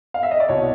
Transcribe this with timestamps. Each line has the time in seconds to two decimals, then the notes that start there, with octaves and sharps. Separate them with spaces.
0.14 F5
0.23 E5
0.31 D#5
0.40 D5
0.49 C2 B2 C#5